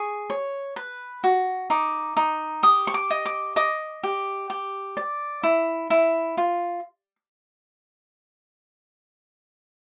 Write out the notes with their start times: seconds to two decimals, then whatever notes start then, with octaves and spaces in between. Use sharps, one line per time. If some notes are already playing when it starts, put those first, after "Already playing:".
Already playing: G#4 C#6
0.30 C#5
0.76 B4
1.24 F#4
1.70 D#4 D6
2.17 D#4
2.63 G4 D#6
2.87 C#6
2.94 D6
3.10 D#5
3.26 D6
3.56 D#5 D6
4.03 G4
4.50 G4
4.97 D5
5.43 E4
5.90 E4
6.37 F4